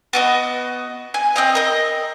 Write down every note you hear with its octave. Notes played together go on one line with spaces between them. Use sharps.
B3 F#4 D#5
G#5
C4 D#5 F5
A#4 D#5